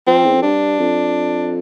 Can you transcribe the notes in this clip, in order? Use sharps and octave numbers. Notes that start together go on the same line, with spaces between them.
F3 C4
E2
F2
G2 D4
F2